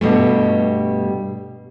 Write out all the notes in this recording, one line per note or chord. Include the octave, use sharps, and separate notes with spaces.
G2 B2 G3 A3